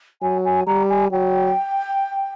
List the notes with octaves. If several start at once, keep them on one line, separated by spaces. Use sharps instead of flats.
F#3 G#5
G#5
G3 A#5
G#5
F#3 G5